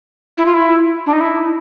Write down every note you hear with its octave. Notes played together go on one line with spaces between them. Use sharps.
E4
F4
E4
D4
D#4
E4